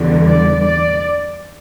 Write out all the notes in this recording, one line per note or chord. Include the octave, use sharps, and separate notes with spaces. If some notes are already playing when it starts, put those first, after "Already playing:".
Already playing: E2 D3 G3
D5
D5